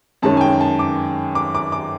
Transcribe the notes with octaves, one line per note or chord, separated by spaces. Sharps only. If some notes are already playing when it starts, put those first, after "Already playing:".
F#2 D#3 G#3 C#4 A5
G#5
G5
A5
D6
D6
D6
D6